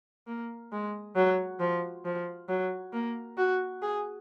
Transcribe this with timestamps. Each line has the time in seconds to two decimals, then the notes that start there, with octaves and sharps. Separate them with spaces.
0.27 A#3
0.72 G#3
1.16 F#3
1.60 F3
2.05 F3
2.49 F#3
2.93 A#3
3.37 F#4
3.82 G#4